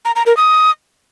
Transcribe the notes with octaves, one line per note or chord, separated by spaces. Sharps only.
A#5
A#5
A#4
D#6